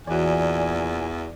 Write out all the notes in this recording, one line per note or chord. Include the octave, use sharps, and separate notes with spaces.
E2 A#2 E3 F#4 D5 G#5